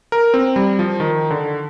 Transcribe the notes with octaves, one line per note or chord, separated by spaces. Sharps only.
A#4
C4
G3
F3
D#3
D3